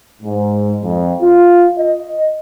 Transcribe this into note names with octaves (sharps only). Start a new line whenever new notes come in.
G#2
F2
F4
D#5